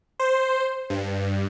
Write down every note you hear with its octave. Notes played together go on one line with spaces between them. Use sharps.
C5
G2